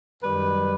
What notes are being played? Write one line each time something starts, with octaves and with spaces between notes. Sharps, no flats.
F#2 D#3 G3 B4